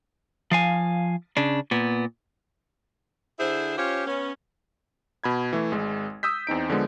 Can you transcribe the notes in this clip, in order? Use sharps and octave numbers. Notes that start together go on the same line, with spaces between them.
F3 F5 G#5
C#3 D4
A#2 B3
D3 E4 G#4 C5
C#4 F4 G4 C5 C#5
B3 C#4
B2 B5 G#6
E3 A3
G#1 G#3
D#6 E6 G6 B6
E2 C4 D#4 D7
D3 F3 G#3 B3